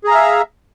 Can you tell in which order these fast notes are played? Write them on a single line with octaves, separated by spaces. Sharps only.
G#4 A#5 F5 E5